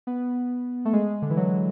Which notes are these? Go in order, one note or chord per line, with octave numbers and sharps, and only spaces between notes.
B3
A3
G#3
D3
E3
F#3